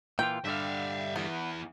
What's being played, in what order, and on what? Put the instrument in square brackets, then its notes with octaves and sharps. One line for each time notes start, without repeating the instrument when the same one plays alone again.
[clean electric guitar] A#2 E3 F4 [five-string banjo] G5
[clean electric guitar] G2 D3 G3 [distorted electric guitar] E5 F5
[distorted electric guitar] E2 E3 [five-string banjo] B3